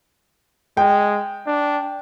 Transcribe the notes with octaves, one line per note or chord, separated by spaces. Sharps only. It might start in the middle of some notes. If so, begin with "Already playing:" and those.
G#3 G5
D4